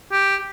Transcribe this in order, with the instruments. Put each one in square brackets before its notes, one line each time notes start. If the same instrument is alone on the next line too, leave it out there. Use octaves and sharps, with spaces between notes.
[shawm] G4